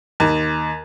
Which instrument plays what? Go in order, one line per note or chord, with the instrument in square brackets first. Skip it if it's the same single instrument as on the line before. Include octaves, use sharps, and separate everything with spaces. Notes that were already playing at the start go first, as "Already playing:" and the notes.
[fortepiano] D#2